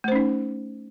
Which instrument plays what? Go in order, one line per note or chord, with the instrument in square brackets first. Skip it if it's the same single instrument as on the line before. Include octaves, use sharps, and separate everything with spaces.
[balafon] A3
C5
C#4
D#4